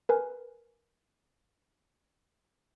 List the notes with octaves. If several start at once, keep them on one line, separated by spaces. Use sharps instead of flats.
A#4 B4 G#5